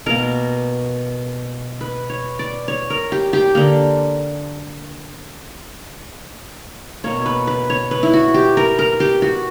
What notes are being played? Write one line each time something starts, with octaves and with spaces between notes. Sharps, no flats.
B2 A#3 A#4
B4
C#5
D5
C#5
A#4
G4
G4
D3 A#3
B2 A#3 C#5
B4
B4
C#5
B4
E4
F#4
G4
A#4
A#4
G4
F#4